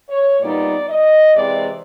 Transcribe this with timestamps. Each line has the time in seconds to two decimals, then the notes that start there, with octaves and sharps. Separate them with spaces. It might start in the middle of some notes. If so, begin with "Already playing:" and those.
0.09 C#5
0.40 A#2 G3 B3 D#4 D5
0.88 D#5
1.34 C3 E3 G#3 C4 D5